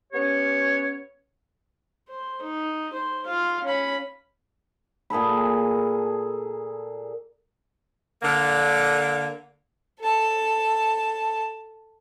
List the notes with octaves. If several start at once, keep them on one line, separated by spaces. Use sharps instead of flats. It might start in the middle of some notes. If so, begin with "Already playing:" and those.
B3 C#4 G4 C#5
C5
D#4
C5
F4 F5
C#4 B5
A#2 G#4 A4 B5
D3 A#3
A4 A5